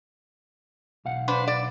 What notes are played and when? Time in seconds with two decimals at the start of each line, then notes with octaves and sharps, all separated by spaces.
1.05 B1 F5 F#5
1.28 D4 B4 C5
1.48 D5